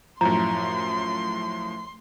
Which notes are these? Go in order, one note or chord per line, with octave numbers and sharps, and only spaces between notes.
F#2 A2 F3 A3 A#5 C6